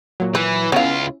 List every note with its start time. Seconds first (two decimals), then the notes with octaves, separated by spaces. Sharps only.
0.20 A#2 F#3
0.35 E3 B4
0.72 C#2 B3 C#4 E4 F4 F5